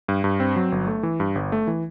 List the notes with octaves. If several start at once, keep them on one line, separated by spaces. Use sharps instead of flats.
G2
G2
C4
F#3
G1
A3
E3
G2
G1
A3
E3